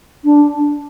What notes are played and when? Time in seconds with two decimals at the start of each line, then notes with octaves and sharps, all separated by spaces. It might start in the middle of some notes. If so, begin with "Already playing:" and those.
0.24 D4